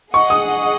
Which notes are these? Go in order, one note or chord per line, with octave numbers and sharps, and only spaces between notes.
G#4 D#5 F#5 C#6
D#6